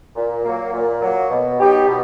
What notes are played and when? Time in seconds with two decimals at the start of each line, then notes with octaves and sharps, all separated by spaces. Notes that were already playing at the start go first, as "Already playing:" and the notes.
0.16 A#2
0.44 F#3 A#3
0.73 A#2
1.02 F#3 A#3
1.30 B2
1.59 F#3 B3 D#4 G4
1.88 B2